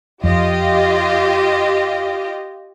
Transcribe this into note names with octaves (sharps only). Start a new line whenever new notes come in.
F2 F4 G4 D#5